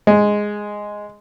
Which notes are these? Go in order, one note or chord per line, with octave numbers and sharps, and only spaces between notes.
G#3